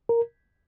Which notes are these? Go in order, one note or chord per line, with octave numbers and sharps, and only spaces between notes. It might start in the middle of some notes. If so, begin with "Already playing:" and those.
A#4